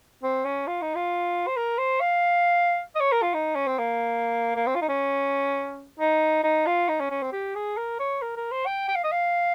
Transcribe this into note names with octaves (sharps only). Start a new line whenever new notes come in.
C4
C#4
F4
D#4
F4
C5
A#4
C5
F5
D#5
C#5
A#4
F4
D#4
C#4
C4
A#3
A#3
C4
F4
D#4
C#4
D#4
D#4
F4
D#4
C#4
C#4
C4
G4
G#4
A#4
C#5
A#4
A#4
C5
G5
G5
F5
D#5
F5